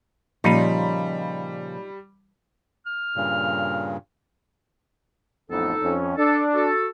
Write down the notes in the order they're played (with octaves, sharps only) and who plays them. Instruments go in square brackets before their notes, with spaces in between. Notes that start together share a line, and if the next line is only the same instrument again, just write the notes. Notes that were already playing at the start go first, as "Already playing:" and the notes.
[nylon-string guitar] A#2 C#3 [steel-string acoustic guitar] F3 [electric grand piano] G3 B5 [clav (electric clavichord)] D#4 F4
[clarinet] F6
[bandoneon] G2 A#2 C#3
[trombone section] A1 F2 B3 [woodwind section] D#4 A4
[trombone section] F2 C#4
[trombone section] D4 [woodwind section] A4
[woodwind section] F#4 A4